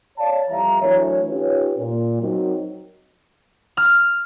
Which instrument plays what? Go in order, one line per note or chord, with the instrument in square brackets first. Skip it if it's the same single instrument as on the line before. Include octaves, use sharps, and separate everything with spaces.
[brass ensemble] C#5 D5 F5 A5
F2 E3 G3 E5 F5 A#5
E3 F#3 A3 D4 A#4 C#5
C#4 D#4 F4 G4 B4 C#5
A#2
F#3 C4 D#4 A#4
[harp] F6